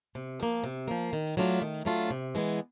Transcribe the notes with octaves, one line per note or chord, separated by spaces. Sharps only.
C3
F3 A#3
C3
F3 A#3
D#3
F#3 A3 D4 F4
D#3
F#3 A3 D4 F4
C3
E3 G#3 B3